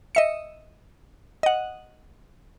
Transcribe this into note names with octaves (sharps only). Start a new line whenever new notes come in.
D#5 E5 C#7
D#5 F#5